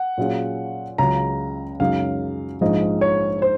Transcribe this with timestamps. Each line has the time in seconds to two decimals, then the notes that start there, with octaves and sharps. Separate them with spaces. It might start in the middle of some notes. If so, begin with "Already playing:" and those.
Already playing: F#5
0.18 A#2 F#3 C#4 F4 G#4
0.98 C#2 C#3 F#3 A#5
1.80 F#2 C#3 G#3 D#4 F#4 F5
2.61 A#1 G#2 F3 G#3 D#5
3.01 C#5
3.42 C5